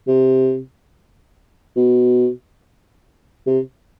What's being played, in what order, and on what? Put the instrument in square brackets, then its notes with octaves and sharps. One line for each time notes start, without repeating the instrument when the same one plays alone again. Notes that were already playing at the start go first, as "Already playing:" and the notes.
[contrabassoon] C3
B2
C3